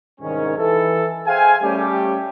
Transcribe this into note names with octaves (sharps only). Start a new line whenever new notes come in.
C2 G#2 D#3 C#4
E3 A4
G#4 C5 E5 F5 G5 G#5
G3 A3 C#4 G4